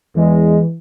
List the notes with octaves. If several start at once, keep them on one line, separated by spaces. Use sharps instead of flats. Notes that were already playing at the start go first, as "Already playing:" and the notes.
E2 E3 G#3